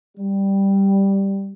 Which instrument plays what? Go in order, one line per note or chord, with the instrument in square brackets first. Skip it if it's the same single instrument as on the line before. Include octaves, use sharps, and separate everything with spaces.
[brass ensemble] G3